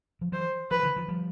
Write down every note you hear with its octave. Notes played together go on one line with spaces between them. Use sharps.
F3
E3 F#3 C5
D#3 F3 B4
D3 E3
D#3 F3
F3 G3